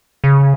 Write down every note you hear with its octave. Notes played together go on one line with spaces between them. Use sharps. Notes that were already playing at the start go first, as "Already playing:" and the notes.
C#3